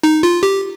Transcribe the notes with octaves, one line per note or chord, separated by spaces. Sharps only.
D#4
F4
G4